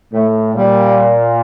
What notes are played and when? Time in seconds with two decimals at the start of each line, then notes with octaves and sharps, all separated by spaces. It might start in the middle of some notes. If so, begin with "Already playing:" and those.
0.13 A2 A3
0.55 A#2 G3